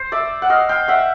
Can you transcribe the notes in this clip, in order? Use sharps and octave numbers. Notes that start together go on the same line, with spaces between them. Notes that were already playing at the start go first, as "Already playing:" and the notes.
Already playing: C5
D5 E5
F#5
D#5 F5
F5 G5
E5 F#5